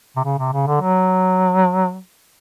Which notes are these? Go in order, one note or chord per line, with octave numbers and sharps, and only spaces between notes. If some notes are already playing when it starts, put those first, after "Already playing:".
C3
C#3
C3
C#3
D3
F#3